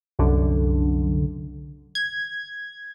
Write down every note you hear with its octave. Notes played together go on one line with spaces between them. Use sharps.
C2 F#2 D3
G#6